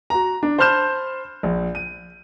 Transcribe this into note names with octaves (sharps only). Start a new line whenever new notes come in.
F#4 A#5
D4
C5 A5 B5 F6 G6 E7
A#1
D#7